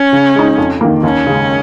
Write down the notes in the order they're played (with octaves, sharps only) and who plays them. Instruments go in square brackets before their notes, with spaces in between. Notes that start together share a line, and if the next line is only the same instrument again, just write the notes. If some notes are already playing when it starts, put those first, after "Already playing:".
Already playing: [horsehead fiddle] C#4
[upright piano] C#3
G#3 D#4
F2
D#3 A#3
[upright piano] D#2 [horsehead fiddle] C#4
[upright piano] C#3 G#3